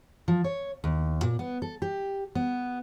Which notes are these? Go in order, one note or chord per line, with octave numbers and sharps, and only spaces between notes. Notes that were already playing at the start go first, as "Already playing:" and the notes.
F3
C#5
D#2
A#2
B3
A4
G4
B3